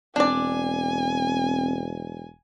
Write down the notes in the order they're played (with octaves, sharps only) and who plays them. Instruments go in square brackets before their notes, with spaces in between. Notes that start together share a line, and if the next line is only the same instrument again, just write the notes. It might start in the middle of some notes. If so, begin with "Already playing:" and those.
[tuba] E1 [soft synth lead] C4 [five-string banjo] D4 D5 [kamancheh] G#5